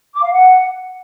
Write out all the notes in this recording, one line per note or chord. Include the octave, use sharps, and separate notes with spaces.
D6
F5
F#5